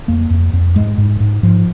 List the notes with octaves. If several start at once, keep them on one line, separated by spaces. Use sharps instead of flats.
F2 A#3
F2
F2
G#2 G#3
G#2
G#2
G#2 F3